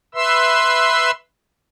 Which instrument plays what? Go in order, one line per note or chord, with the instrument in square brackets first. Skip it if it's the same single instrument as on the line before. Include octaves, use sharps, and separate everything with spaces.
[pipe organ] B4 E5 C6 E6